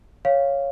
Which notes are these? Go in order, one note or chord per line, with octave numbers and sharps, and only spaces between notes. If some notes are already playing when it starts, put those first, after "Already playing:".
C#5 F5